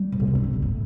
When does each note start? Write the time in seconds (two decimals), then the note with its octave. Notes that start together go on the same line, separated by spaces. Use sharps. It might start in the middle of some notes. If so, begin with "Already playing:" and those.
Already playing: G3
0.12 A2
0.20 B2
0.27 C3
0.35 D3
0.44 C3
0.53 B2
0.62 A2